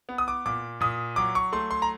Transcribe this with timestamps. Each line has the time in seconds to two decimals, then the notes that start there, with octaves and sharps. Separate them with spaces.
0.09 B3
0.18 D#6
0.28 D6
0.46 A#2 D6
0.81 A#2 D#6
1.16 F#3 D6
1.35 C#6
1.53 A3 C6
1.71 C6
1.82 A#5